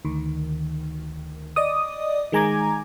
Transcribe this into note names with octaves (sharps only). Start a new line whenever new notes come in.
D2 D#3
D5 D#5 D6 D#6
D#3 G#3 G#5 A#5 D6 G#6